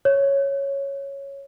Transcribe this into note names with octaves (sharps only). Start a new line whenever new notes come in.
C#5